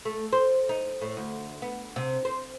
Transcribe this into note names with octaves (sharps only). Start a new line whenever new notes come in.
A3
C5
D#4
A2
D2
B3
C3
C5